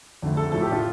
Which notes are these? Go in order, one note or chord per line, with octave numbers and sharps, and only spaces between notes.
F2 D3 A3
A4
A2 F3 A3 A4
G4
F4